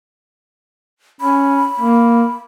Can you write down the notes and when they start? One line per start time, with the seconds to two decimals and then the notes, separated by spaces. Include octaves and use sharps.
1.21 C#4 B5
1.80 A#3